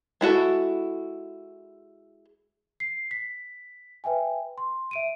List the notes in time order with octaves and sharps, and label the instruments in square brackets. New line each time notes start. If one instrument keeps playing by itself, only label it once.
[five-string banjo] G#3 E4 F#4 A4
[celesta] C7
B6
B4 E5 G5 G#5
C6
E5 D7 D#7